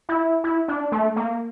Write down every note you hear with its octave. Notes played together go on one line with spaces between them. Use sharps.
E4
E4
D4
A3
A#3